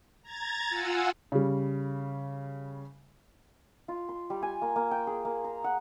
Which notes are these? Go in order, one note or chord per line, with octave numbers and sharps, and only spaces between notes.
A#5 G#6 A6
F4 F#5 G#5 E6
C#3 G3
F4
C6
G3
G#5
A#3
A#3
G5
G#4
A#3
A#5
F#5